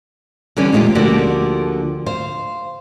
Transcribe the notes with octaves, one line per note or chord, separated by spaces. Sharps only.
D3 E3 G3 C#4
E2 A#2 G#3 E4 F4 G4
D2 D3 F3 A#3 F#4 G4
C5 F5